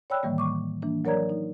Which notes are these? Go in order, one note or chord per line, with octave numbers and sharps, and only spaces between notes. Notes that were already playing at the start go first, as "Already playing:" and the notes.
C#5 D5 G5 B5 E6 F#6
A2 D#3 E3 G3 A#3
C#6 D6
E3 A#3 D4
F#3 A#4 C#5 D5 A#5 G#6
D#4